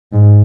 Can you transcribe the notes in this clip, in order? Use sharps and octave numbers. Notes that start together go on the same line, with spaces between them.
G#2